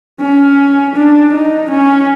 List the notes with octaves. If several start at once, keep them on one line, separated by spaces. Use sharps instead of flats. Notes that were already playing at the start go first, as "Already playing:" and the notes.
C#4
D4
D#4
C#4